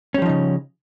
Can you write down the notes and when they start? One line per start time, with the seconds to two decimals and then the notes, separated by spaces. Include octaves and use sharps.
0.14 C#4
0.18 G3
0.22 F3
0.26 D#4
0.29 C#3